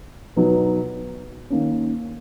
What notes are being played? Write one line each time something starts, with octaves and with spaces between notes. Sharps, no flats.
B2 F#3 B3 D#4
D#3 A#3 C#4